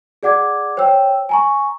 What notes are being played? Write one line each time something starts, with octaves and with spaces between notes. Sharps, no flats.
G#4 D5 F#5 D6 G#6
C5 C#5 G5 E6
G#5 A#5 C#6